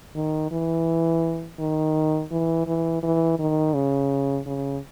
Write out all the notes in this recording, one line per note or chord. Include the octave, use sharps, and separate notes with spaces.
D#3
E3
D#3
E3
E3
E3
D#3
C#3
C#3